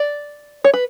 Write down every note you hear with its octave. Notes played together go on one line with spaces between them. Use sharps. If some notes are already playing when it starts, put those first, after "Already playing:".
Already playing: D5
C#5
B4